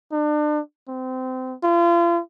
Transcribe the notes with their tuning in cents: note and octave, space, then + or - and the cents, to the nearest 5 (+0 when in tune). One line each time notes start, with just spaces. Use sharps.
D4 +35
C4 -25
F4 -35